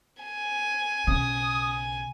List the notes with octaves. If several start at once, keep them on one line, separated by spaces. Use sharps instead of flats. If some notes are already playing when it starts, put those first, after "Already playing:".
G#5
B1 C#3 D#6